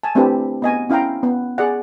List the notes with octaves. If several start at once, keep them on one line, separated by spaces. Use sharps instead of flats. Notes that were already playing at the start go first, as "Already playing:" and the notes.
G#5 A5
A3 C4 D4 E4 G4 B4
B3 D#5 G#5
C#4 E4 F5 G5 A#5
B3
G#4 D5 F#5